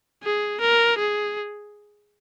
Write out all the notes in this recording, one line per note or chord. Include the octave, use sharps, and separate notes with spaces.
G#4
A#4
G#4